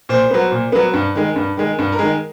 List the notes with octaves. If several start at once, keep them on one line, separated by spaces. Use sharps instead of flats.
A#2 C5
F#3 B3
A#2
F#3 B3
G2
D#3 G#3
G2
D#3 G#3
G2
A#4
D#3 G#3